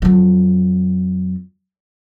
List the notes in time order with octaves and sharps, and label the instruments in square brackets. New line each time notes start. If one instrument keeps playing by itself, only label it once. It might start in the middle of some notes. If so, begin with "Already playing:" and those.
[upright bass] F2 F#3